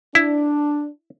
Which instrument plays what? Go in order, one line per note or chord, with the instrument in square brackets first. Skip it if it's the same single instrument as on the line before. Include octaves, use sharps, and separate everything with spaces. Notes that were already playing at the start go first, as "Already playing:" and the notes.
[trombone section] D4 [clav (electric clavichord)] E4